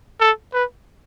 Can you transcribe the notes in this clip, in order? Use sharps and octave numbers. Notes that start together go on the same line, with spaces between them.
A4
B4